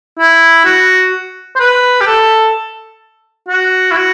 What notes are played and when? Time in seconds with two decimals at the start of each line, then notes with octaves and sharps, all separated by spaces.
0.18 E4
0.65 F#4
1.56 C5
1.59 B4
2.01 G4
2.07 A4
3.48 F#4
3.91 E4
3.96 F#4